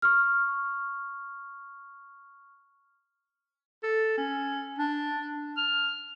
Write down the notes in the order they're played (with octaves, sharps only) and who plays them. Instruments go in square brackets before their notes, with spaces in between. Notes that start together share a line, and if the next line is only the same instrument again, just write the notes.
[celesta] C#6 F6
[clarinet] A4
C#4
D4
F6